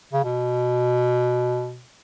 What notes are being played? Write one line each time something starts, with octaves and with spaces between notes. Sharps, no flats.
C#3
B2